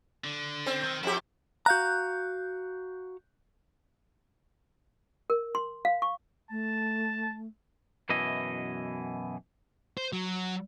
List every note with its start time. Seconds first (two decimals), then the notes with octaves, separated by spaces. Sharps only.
0.24 D3
0.66 C4
0.83 D#3
1.03 F2 E4 G4
1.66 F#4 F5 A#5 F#6 G6
5.30 A#4
5.55 C6
5.85 F5
6.02 C#6
6.51 A3 A5
8.09 F#2 B2 E3 E4 D#5
9.97 C5
10.13 F#3